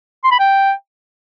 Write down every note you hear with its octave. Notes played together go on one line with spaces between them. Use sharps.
C6
B5
G5